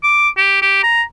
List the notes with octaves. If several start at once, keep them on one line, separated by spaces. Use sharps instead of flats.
D6
G4
G4
A#5